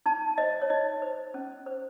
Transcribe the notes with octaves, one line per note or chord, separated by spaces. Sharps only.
D#4 A5
C5 D#5
C#5
D#4 D#5
C5
C#4
C5